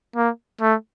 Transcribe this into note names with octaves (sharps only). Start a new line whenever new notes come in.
A#3
A3